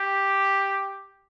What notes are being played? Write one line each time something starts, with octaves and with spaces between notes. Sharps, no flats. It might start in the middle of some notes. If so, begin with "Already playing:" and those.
Already playing: G4